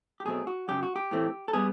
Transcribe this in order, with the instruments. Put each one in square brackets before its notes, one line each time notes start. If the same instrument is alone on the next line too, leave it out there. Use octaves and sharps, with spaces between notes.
[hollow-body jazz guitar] G4
B1 B2 F#3 A3 C4 G#4
F#4
F#2 C#3 F#3 G4
F#4
G4
A2 E3 A3 C4
A4
G3 B3 G#4